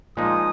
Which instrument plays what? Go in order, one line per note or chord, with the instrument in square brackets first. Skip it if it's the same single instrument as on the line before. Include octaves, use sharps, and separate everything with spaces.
[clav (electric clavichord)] A#2 F3 G#3 D#4 [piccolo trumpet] D#6